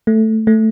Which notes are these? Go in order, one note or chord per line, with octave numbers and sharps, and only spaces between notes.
A3
A3